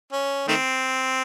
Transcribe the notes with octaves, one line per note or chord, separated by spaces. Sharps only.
C#4
D#3 A3 C4